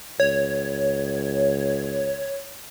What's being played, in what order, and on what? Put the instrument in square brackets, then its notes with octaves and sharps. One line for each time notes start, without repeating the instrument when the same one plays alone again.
[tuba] C#2 [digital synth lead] C#5